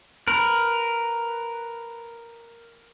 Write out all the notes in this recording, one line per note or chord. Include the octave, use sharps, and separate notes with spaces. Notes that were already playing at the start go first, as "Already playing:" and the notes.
A#4 B4